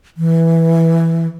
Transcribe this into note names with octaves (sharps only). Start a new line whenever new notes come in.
E3